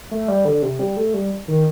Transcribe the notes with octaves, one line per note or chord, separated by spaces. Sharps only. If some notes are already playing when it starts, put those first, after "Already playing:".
A3
G3
D3
C3
G3
A3
G3
D#3